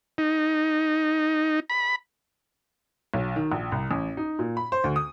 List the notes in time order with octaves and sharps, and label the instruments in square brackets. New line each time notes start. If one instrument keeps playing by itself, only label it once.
[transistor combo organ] D#4
B5
[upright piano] B1
D#3
A#1
C2
A1
D#4
A#2
B5
C5
D2
D#6